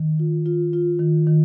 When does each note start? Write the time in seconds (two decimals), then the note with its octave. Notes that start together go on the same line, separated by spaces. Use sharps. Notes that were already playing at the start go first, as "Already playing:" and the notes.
Already playing: D#3
0.19 F4
0.46 F4
0.73 F4
0.99 D#3
1.27 D#3